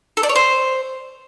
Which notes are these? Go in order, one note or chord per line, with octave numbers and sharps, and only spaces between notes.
A4
D5
C#5
C5